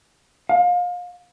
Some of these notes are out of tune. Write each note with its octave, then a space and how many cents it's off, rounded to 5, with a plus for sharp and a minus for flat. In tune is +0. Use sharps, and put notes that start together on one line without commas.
F5 +30